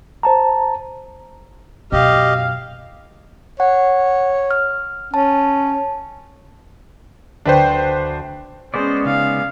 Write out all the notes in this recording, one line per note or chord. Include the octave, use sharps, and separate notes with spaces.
C5 A5 A#5
F#2 B2 G4 D#5 F5
C#5 F#5
F6
C#4 A5
D2 D4 B4 C5 G5
G#3 B3 C#4 G#4 C5 D5 D#6
C#3 D#4 F5